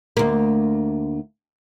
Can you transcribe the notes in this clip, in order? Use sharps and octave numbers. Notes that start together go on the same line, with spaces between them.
D2 A#3